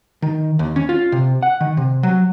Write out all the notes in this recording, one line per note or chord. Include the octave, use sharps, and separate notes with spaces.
D#3
D#2
C#4
F4
C3
F#5
D#3
C3
F#3